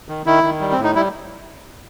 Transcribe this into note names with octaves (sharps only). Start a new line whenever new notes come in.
D#3
D#3 E4
D#3
G3
C4
A2
D#4
G3 E4